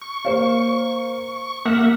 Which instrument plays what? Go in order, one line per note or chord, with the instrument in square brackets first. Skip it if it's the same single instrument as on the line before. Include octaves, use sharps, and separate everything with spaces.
[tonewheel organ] C#6
[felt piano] A#3 C5 F5
[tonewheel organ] A#3 E5 F#5 [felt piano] F6